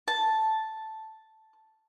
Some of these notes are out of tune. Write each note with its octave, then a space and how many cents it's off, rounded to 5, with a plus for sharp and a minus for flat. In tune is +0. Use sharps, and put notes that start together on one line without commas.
A5 +0